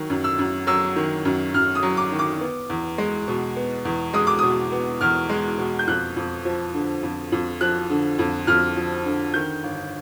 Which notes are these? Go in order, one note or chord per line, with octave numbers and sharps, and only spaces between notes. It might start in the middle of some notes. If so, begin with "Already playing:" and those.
Already playing: D#3 F#3
F#2
E6
F#2
F#3 E6
D#3
F#2
F#2 F6
D#6
F#3
D6
D#3
D6
B3
E2
G#3
B2
B3
E2
G#3 D#6
D6
B2 D#6
B3
E2 F6
G#3
B2
G6
F2 F#6
F2
F3
D3
F2
F2
F3 F#6
D3
F2
F2 F6
F3
D3
D#3 G6
G1